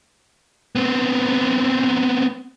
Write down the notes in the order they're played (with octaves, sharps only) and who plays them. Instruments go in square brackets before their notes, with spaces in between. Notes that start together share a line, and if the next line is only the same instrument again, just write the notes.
[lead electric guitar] B3 C4